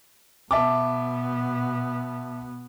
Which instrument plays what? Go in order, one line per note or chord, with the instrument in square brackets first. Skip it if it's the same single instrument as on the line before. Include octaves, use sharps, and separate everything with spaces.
[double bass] B2 B3 [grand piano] E5 A5 D6